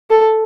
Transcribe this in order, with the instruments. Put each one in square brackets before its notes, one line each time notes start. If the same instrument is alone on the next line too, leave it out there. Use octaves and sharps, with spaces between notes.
[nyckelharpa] A4